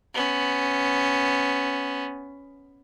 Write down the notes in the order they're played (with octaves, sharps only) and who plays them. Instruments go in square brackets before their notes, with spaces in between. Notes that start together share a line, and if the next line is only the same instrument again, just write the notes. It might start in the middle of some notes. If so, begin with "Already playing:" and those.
[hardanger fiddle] B3 C#4